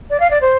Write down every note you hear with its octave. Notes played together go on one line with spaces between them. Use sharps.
D5
F5
D5
C5